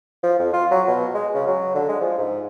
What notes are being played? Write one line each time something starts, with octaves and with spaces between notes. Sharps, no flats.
F3
F2
F4
F#3
B2
G#3
C#3
F#3
D3
G#3
F3
G#2